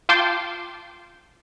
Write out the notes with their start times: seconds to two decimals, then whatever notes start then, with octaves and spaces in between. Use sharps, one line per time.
0.09 F4 G5 A5 C6 D6